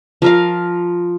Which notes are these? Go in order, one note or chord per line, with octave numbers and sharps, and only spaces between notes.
F3 A#4 F5